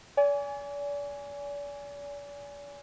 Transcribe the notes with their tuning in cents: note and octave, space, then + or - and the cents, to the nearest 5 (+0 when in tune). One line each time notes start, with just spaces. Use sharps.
D5 -40 G#5 +0